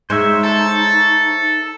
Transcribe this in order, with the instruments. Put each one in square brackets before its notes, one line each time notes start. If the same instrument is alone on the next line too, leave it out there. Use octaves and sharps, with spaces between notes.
[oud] G#3 [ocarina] D#4 [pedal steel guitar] C5 C#5 E5
[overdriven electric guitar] A4